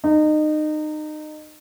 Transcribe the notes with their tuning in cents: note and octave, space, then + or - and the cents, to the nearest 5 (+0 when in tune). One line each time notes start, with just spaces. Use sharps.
D#4 -25